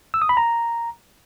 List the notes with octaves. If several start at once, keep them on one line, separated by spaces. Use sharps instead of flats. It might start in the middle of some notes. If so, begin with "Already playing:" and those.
E6
D#6
B5
A#5